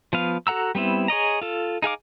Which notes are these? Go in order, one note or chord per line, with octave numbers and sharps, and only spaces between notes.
F3 B3 F5
F#4 A4 F#5 A#5 E6
G3 B3 C4 E4
G#4 C#5 D#5 A#5
F4 A4
D#4 G#4 F5 D6